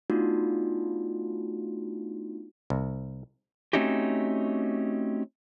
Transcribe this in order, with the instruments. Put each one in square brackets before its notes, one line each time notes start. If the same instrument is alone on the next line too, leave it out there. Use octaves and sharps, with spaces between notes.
[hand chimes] A3 B3 D4 D#4 F4 F#4
[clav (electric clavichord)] C2
[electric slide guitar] A3 C4 C#4 D#4 F#4 G4